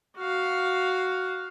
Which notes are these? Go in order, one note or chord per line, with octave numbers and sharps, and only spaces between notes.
F#4 F5